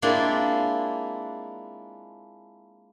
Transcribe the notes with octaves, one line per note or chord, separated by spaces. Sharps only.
G#3 A#3 C4 D4 E4 F4